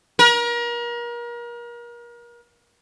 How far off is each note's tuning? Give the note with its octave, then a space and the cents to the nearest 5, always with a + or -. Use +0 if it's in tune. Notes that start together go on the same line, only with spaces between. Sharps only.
A#4 +35